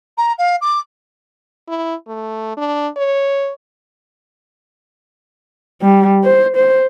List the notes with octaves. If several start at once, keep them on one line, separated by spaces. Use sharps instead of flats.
A#5
F5
D6
E4
A3
D4
C#5
G3
C5
C5